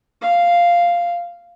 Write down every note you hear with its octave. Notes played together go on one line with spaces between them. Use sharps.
F5